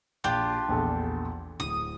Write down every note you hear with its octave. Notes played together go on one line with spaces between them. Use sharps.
A#1 D4 F4 G4
A#1 E2 A4
D1 D#6